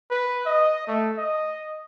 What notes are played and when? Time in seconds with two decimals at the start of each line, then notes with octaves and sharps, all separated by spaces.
0.11 B4
0.46 D#5
0.87 A3
1.18 D#5